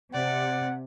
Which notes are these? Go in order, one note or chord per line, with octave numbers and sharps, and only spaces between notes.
C3 D5 F#5